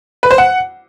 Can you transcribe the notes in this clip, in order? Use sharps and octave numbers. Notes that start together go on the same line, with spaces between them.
B4
C5
F#5